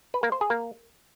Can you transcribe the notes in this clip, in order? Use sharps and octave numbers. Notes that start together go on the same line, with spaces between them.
B4
A#3
C5
G#4
A#3